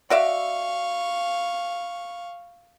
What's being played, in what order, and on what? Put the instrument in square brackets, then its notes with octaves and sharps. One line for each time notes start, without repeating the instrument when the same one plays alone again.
[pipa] F#4 D5 E5 [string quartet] F5 C#6